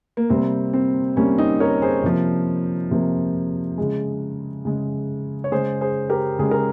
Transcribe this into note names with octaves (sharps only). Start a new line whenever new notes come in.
A#3
C3 G3 A#3 C4
C4
C3 G3 A#3 C#4
C4 D#4
A#4 C#5
G#4 C5
C3 F3 A#3
C3 F3 A#3
C#3 G#3
C#3 G#3
C#5
C#3 G#3 G#4 C5
G#4 C5
G4 A#4
C#3 G#3 G#4
A#4